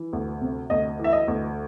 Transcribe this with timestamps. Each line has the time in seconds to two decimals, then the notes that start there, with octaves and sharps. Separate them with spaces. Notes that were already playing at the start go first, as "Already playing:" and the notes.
Already playing: E3
0.13 D2
0.41 C3
0.70 D2 D#5
0.99 E3
1.04 E5
1.13 D#5
1.28 D2